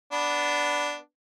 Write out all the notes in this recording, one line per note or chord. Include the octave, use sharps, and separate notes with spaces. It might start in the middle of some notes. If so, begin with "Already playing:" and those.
B3 D4